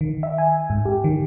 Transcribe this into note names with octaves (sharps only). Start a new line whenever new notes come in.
D#3
E5
G#5
G#2
G4
D#3